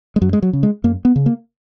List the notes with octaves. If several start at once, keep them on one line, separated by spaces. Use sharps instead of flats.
G#3
F#2 F#3
G#3
F#3
C#3
G#3
F#2 A#3
B3
C#3
A#3